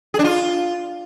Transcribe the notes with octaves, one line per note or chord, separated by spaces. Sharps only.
G#4
D4
F4